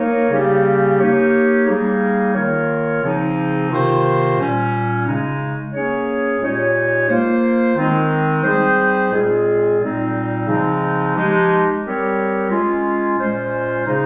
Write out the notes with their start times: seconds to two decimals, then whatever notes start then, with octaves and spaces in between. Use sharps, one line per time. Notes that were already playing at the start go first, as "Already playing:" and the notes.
Already playing: A#3 D#4 A#4 C#5
0.30 C#3 G3 A#3 C#4 G4
0.99 A#3 D#4 G4 C#5
1.66 G3 A#3 D#4 G#4
2.34 D#3 A#3 F4 A#4 C#5
3.02 C#3 F3 C4 D#4
3.69 C3 D#3 A#3 F4 C5
4.37 A#2 G3 C#4
5.05 C#3 G#3 D#4
5.73 A#3 C#4 G#4 C#5
6.40 A#2 G#3 D#4 G4 C#5
7.08 A#3 F4 C5
7.76 D#3 G#3 C4 D#4
8.43 G3 C4 D#4 G#4 C5
9.11 A#2 G#3 C4 F4 G#4
9.79 A#2 G3 C4 D#4
10.47 C#3 F3 G#3 C4 D#4
11.15 F3 G#3 D#4 G4
11.83 G3 C4 G4 A#4 C#5
12.50 G#3 C#4 F4
13.18 A#2 G#3 C#4 F4 C5
13.86 C#3 G#3 D#4